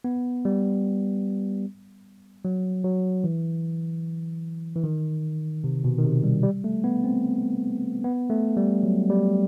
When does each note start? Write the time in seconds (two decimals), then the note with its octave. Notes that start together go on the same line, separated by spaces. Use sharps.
0.04 B3
0.45 G3
2.45 F#3
2.84 F#3
3.24 E3
4.76 E3
4.84 D#3
5.64 C3
5.84 B2
5.98 D#3
6.04 C3
6.24 G3
6.43 G3
6.64 A3
6.84 B3
7.04 C4
8.04 B3
8.30 A3
8.57 G3
8.83 F#3
9.10 G3